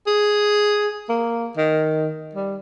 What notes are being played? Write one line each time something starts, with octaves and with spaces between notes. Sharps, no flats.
G#4
A#3
D#3
G3